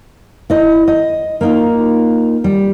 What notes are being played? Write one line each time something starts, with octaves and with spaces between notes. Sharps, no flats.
E4 D#5
D#5
A#3 D#4 F4
G3